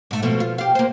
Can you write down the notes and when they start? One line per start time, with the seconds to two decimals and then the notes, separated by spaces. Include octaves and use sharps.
0.11 G#2 A3
0.22 B2 F3 A3
0.40 F4
0.58 G4 F5
0.75 A#3 C5